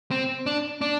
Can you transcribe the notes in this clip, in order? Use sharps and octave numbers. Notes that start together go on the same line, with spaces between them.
C4
D4
D4